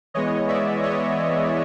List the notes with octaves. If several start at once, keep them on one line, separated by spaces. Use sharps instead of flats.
E3 G#3 B3 C#5 D#5
D5 E5
C#5 D#5